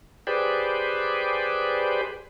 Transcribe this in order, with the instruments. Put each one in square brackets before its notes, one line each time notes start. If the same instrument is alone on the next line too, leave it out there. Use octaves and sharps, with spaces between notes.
[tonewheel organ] G4 G#4 B4 C5 D5